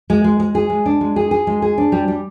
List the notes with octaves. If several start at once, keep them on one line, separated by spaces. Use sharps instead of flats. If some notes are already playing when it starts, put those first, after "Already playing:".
G#3
G#3
G#3
G#4
G#3
D4
G#3
G#4
G#4
G#3
G#4
D4
G3
G3